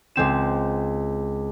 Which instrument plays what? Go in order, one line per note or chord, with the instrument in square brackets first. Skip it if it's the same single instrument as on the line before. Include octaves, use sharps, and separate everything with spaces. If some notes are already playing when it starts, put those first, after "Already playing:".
[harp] C#2 G#3 C4 E7